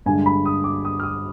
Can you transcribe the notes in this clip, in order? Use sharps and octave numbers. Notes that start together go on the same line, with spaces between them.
G2 D3 G#3 G#5
B5
D#6
D6
D#6
F6
D#6